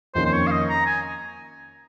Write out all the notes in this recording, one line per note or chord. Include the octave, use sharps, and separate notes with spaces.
F2 D#3 A#3 C#4 C5
C5
C#5
F5
D#5
A#5
G#5